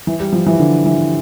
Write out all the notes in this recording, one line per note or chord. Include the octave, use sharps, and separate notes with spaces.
E3
G3
F3
E3
D3
E3